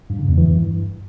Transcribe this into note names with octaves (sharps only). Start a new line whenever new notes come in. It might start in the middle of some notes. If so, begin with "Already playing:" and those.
G2
C#3
E2
E3
G2